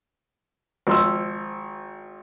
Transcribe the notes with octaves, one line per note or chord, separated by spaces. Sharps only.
G#1 F3 C6 E6